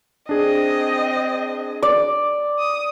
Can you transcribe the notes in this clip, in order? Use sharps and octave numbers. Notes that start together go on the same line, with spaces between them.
C4 D4 G#4 D#5
D5
D#6